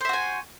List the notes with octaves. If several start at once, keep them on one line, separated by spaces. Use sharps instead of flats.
F#4 C5 E5 G#5